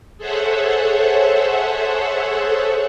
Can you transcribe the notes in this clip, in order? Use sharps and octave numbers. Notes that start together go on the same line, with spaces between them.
G#4 A4 C5 C#5 E5 F#5